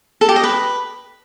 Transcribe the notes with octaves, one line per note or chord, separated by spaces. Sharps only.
A4
G4
D#5
B4